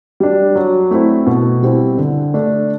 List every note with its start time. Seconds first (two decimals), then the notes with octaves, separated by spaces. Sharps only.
0.20 G3 D4
0.56 F#3
0.91 A3 C4 E4
1.26 B2
1.63 G3 C4 E4
1.98 D3
2.34 A3 D4